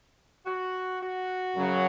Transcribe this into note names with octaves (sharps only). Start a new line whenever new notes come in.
F#4
F#4
F#2 C#3 F#3